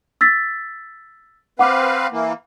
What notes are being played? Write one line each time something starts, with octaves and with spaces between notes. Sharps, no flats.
E6 A6 B6
C4 B4 F5 F#5 D6
E3 A#3